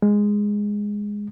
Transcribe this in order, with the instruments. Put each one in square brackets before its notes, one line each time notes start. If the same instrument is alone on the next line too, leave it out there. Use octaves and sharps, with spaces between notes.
[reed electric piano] G#3